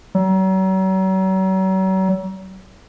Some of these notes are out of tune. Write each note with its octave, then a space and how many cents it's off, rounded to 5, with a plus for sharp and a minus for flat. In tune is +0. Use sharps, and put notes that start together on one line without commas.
F#3 +40